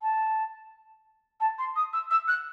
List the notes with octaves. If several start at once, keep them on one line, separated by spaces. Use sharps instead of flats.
A5
A5
C6
D#6
E6
E6
F#6